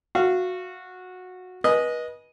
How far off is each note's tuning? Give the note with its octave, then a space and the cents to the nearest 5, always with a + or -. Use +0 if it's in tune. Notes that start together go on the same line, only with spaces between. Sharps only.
F#4 -15 F5 -25
B4 -30 D#5 +0 G#5 +20